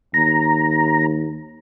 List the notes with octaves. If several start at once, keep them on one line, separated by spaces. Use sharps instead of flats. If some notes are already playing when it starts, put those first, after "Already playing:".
D#2 A#5